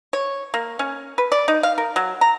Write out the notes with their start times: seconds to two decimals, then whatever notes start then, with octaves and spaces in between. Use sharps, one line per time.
0.13 C#5
0.54 A#3
0.79 C#4
1.18 B4
1.32 D5
1.48 D#4
1.63 F5
1.78 A#4
1.96 F#3
2.21 A#5